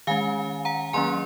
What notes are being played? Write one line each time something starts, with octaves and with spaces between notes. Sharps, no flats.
D#3 G#3 C#4 F5 G#5
F#5 A#5
D#3 F#3 A#3 C#4 G#5 C6